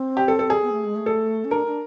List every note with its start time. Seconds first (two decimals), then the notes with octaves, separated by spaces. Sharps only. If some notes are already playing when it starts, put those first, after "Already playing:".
Already playing: C4
0.17 G4
0.28 A4
0.39 A4
0.50 G#4
0.62 B3
0.72 A3
0.85 G#3
0.96 A3
1.06 A4
1.45 C#4
1.51 D4 A#4
1.66 D4